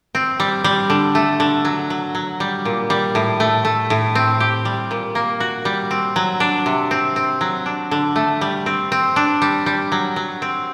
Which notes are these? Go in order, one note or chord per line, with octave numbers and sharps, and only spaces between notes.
C4
G3
G3
D3
A3
D3
F#3
F#3
F#3
G3
A#2
G3
A2
A3
A3
A2
C4
G4
G3
A#2
A#3
F#4
G3
C4
F#3
D4
C3
C4
C4
F#3
D4
D3
A3
G3
C4
C4
D4
G3
G3
F#3
F#3
C4